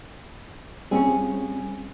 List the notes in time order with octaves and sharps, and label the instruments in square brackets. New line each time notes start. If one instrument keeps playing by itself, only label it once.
[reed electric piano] G3 C4 F4 [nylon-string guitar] C#4 G#4